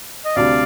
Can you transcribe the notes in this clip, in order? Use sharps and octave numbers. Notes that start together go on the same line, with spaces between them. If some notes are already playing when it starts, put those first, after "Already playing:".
D#5
D2 C3 G3 D4 D5 F5